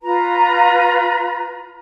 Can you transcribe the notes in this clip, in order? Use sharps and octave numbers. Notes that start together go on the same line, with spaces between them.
F4 B4 A#5